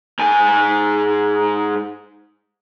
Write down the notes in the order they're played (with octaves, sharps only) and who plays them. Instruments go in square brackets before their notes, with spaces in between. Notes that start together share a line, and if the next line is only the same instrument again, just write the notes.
[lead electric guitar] G#2 G#5